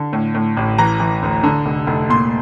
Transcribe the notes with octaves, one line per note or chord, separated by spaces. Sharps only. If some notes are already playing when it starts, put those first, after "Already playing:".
Already playing: D3
A2
A2
A1
E3 A#5
E3
D2
D3
F1
F1
A#2 C6